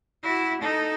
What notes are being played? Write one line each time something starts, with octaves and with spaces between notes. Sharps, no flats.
E4 F#4
D#4 A4